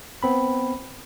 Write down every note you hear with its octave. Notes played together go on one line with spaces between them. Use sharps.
B3 C4 B5